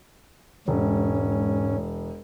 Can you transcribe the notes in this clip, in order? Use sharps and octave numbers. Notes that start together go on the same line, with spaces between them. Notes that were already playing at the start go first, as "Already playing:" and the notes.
E1 G#2 C#4